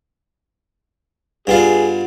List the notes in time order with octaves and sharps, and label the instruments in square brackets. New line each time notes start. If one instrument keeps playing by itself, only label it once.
[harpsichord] G2 B3 F4 [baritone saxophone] G#4